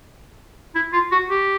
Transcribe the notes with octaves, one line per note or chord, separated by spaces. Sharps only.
E4
F4
F#4
G4